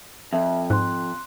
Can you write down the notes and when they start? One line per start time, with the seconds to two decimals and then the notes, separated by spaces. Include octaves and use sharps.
0.33 F2 E5
0.70 G#2 C6 F#6